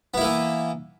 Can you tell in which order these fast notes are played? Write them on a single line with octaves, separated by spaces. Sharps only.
B3 E4 A#3 E3